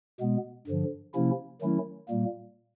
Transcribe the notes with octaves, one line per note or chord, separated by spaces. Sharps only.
B2 G#3 B3
G2 D3 F3
C3 F3 A#3 C#4 E4
D#3 F#3 A3 C#4 E4
A#2 G3 A#3